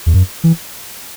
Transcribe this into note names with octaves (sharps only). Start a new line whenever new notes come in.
E2
F#2
E3